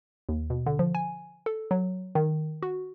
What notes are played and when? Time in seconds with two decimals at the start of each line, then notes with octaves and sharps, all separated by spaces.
0.29 D#2
0.50 B2
0.66 D3
0.79 F3
0.95 G#5
1.46 A4
1.71 F#3
2.15 D#3
2.63 F#4